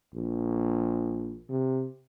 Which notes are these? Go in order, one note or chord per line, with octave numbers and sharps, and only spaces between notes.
A#1
C3